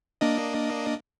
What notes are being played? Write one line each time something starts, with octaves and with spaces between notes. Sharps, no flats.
A#3 D4 D#5